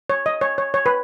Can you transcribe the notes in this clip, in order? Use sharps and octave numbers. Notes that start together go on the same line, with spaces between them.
C#5
D#5
C#5
C#5
C#5
B4